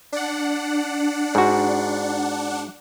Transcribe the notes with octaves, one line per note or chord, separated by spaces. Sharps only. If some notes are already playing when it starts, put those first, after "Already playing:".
D4 F#5
G#2 F#4